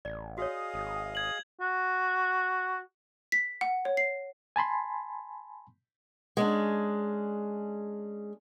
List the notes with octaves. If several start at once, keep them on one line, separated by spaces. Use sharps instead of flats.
A1 D5
F#4 G#4 C#5 D#5 F5
G#1
G#6 F#7
F#4
B6
F#5
C#5
C7
G#5 A5 B5 C6
G#3 C#4 D4